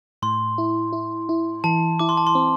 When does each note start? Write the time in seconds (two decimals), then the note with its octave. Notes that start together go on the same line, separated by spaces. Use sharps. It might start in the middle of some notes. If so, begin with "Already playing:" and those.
0.22 A2 C6
0.58 E4
0.93 E4
1.29 E4
1.64 E3 A5
1.99 E4 D6
2.09 C6
2.17 A5
2.27 C6
2.35 C4